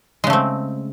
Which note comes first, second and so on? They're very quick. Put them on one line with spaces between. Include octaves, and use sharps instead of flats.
G#3 C#3 A3 C4